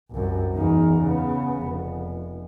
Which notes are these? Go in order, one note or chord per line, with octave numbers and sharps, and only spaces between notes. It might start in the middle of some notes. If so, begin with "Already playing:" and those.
C2 F#2
E2 D#4
C#3 B3
F1